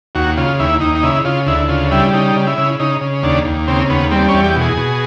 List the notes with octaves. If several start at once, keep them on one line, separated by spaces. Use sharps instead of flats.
D#2 F#4
C#3 F4
D#2 E4
D#2 D#4
D#4
C#3 E4
C#3 F4
D2 E4
C#3 F4
G3 E4
C#3 D#4
C#3
E4
C#3
C#3 D#4
C#3
D#2 D4
D#2
C#3 C4
D#2 B3
G3 C4
C#4
E2
G4
B2 G#4
B2